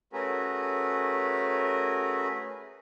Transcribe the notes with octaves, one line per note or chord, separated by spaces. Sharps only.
A3 C#4 F#4 G#4 A#4 B4